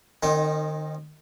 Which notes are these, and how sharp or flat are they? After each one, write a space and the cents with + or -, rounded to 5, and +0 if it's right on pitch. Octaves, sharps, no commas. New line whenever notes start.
D#3 -30 C4 +25 D#4 +0